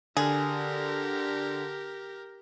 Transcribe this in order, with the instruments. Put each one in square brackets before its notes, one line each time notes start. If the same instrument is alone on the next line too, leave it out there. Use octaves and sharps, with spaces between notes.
[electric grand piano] D3 [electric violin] G4 A#4 [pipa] G#4